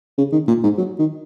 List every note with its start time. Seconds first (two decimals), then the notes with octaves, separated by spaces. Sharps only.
0.18 C#3
0.32 D#3
0.48 A#2
0.64 G#2
0.78 F#3
0.99 D#3